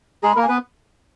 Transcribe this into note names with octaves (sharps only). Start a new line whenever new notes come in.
G#3 G#4 A#5
A#3 A#4 B5
G#5
B3 B4